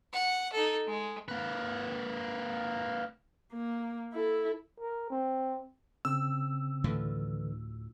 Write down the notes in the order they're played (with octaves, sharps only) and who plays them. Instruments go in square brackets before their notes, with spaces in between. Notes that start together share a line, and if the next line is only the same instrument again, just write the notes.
[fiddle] F#5
D#4 A4
G#3
[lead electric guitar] A#3 B4
[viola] A#3
E4 A4
[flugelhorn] A#4
C4
[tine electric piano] C#3 C4 [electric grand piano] E6
[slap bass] D2 A2 F3 [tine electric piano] D3 E3